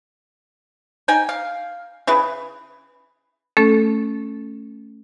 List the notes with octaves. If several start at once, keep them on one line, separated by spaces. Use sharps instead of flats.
D#4 G5 G#5
F5
C#3 E4 G#4 B4
A3 C#4 A4